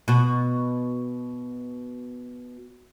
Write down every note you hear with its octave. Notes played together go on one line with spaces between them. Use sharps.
B2 F#4